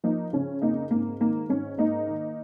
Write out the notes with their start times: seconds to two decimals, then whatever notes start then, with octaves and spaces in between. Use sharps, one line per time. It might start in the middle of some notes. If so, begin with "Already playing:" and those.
0.04 F3 A#3 D#4
0.33 C#3 C#4
0.62 F2 A#3 D#4
0.91 G#2 A#3
1.20 D#3 A#3
1.49 G#2 C#4
1.78 G#2 A#3 D#4
2.07 D#3